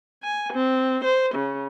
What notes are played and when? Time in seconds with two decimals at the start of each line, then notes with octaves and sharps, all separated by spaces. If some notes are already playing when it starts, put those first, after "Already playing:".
0.23 G#5
0.54 C4
1.04 C5
1.34 C#3